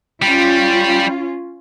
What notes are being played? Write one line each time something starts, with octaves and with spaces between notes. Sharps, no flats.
G3 C#4 F4